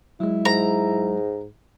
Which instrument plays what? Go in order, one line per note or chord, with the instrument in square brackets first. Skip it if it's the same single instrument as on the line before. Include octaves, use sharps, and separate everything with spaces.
[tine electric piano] F#3 G#3 [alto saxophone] E4
[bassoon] G#2 [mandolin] A#5